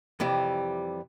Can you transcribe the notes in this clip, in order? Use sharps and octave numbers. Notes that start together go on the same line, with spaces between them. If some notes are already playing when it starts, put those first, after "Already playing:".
F2 C3 E3 G3